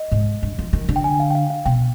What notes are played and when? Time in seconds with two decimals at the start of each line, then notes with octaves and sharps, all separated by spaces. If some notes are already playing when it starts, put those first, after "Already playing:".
Already playing: D#5
0.12 G#2
0.42 G2
0.58 F3
0.73 D#3
0.89 D3
0.96 G5
1.04 G#5
1.20 F5
1.30 G5
1.35 F5
1.50 F5
1.66 B2 G5